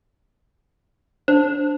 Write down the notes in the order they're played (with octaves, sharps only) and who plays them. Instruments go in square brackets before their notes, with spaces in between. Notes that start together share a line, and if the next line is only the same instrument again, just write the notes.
[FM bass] D4 [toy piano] C5